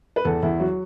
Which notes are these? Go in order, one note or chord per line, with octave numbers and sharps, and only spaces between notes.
B4
E2 A4
E2 E4
F#3 F#4